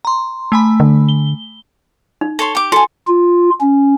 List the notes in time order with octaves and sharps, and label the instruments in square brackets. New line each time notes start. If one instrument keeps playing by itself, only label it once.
[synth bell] A#5 C6
A3 G#5 B5
[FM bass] D3
[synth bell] G7
[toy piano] D#4
[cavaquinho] A4 C#5 C6
G4 D6
[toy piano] F#4 [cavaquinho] A4 G#5
[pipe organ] F4
C#4